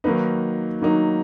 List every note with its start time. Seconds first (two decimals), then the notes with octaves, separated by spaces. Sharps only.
0.04 D#3 F#3 A#3 D#4 B4
0.81 D#3 F#3 A#3 D#4